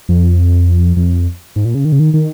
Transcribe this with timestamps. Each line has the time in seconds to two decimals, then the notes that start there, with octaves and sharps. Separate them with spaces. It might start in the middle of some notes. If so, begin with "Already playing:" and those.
0.09 F2
0.96 F2
1.56 G#2
1.65 A#2
1.75 C#3
1.85 D#3
1.92 C#3
1.99 D#3
2.14 D#3